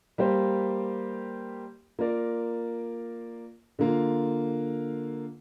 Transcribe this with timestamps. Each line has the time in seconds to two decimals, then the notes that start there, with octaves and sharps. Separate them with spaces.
0.18 G3 A#3 G4 C5
1.99 A#3 F4 A#4 D5
3.79 D3 A#3 F4